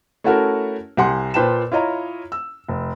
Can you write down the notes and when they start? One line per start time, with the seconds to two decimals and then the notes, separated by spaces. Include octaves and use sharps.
0.24 A3 C#4 E4 F#4 A4 A#4
0.97 C2 G4 F#5 G#5 C6
1.34 A#2 B4 C5 G5 A5 E7
1.72 E4 F4 C#5 D#5 A#5
2.32 E6
2.69 F1